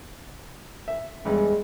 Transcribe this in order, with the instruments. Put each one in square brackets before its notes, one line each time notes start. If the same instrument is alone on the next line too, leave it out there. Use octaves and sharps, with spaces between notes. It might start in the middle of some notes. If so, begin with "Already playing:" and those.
[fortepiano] E5
[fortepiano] E2 G2 [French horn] G#3